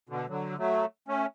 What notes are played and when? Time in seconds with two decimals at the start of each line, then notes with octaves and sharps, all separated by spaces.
0.09 B2 D3
0.29 D3 F#3
0.58 F#3 A3
1.08 A3 C#4